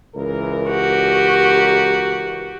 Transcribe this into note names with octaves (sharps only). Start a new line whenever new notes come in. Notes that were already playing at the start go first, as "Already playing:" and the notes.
C#2 E3 A#4
F#4 G4